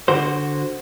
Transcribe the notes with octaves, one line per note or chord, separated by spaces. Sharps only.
D3 F#4 C5